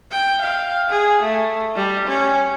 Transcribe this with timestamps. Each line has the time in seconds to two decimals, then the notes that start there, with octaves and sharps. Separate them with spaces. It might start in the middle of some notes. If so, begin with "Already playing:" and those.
0.11 G5
0.41 F5
0.90 G#4
1.22 A3
1.76 G3
2.07 C#4